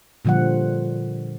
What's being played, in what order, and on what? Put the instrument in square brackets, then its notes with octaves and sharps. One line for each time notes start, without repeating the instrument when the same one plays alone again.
[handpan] A#2 D3 F3 G3 F#5